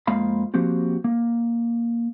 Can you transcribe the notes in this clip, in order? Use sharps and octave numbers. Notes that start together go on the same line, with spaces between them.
F2 F3 G#3 A#3 F5 B5
F3 A#3 C4 F#4 G4
A#3